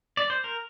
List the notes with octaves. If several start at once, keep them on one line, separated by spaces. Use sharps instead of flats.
D5
C5
A#4